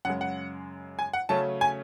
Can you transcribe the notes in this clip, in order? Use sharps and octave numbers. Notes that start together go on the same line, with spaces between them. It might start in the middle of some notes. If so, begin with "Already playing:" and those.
F#2 C#3 G#3 F#5
F#5
G#5
F#5
C#3 F#3 A3 C#4 A5
G#5